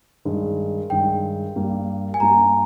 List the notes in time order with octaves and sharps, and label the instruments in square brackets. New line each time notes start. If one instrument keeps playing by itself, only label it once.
[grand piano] G2 D#3 G#3
[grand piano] G2 D#3 G#3 [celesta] G5
[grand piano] G2 G3 A#3
[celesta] G#5
[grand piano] G2 G3 A#3 [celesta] A#5